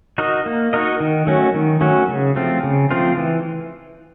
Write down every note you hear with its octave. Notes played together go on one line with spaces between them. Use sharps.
D#4 F#4 A#4 D#5
A#3
D#4 F#4 A#4 D#5
D#3
F#3 A3 C#4 F#4
D#3
F#3 A3 C#4 F#4
C#3
F3 A3 C4 F4
C#3
F3 A3 C4 F4
E3